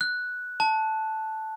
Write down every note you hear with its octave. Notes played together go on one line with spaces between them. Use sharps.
F#6
A5